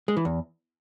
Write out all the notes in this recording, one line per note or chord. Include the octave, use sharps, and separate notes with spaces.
G#3
E3
E2